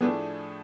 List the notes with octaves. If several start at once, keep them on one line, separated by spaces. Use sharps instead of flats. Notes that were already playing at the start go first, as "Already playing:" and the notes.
A2 F3 A3 B3 D4 G#4